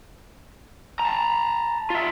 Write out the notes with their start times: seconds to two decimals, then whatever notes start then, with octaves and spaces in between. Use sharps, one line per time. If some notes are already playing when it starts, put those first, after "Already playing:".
1.00 A5 A#5
1.90 F4 E5